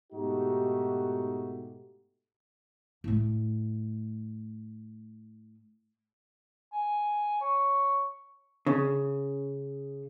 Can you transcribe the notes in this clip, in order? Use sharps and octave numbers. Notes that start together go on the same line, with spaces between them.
G#2 B2 A3 D#4 F#4 G4
A2 A3
G#5
C#5
C#3